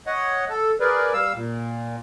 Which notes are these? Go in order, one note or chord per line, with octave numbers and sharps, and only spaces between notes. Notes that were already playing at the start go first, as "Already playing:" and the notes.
C#5 D#5 F#5
A4
G#4 A#4 B4 D5
G3 F5 E6
A#2